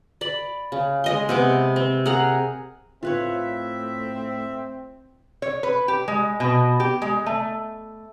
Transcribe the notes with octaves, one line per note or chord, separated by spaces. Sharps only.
D5 B5
C#3
G#3 D#5 C6
C3 B3 D6
C4
G#4 A#4 F#5 A#5
A2 C4 F4 B4 C#5 E5
C#5
B4
G4
G#3
B2
G4
G#3
A3